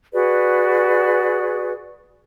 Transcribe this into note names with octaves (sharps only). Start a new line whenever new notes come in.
F#4 G#4 B4 D5